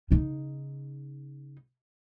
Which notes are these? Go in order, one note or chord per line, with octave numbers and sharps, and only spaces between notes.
C#3 D#4